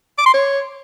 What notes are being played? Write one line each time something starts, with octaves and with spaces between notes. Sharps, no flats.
D6
C6
C#5